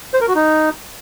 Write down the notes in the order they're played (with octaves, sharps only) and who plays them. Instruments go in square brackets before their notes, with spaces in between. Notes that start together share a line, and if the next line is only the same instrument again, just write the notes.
[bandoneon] C5
A#4
F#4
D#4